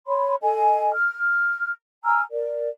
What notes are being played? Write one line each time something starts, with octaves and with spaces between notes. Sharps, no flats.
C#5 B5 C6
A4 D#5 G#5
F6
G#5 A#5 E6 F6
A#4 D5